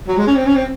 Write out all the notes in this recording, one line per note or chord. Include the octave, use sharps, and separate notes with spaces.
F#3
G#3
C#4
C4
C#4
C4